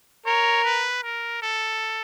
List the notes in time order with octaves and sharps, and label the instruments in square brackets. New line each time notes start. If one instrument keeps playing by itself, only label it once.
[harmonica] A#4 [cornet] C#5
[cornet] B4
A#4
A4